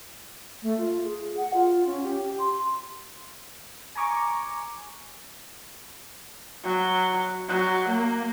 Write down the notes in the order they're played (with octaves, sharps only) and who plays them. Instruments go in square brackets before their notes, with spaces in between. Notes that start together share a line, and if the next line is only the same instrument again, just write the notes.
[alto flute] A3
F4
G#4
F#5
F4
C#4
G4
C6
[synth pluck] G#5 A#5 C#6 D6
[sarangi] F#3
F#3
A#3